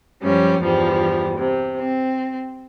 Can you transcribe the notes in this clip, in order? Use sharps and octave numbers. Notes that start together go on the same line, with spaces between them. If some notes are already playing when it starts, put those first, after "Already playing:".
F#2 F3 G3 C#4
E2 G2 F3 G3
C3
C4